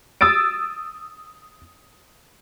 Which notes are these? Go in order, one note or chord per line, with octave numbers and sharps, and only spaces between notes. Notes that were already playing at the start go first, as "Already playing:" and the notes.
D#6 E6 A6 D7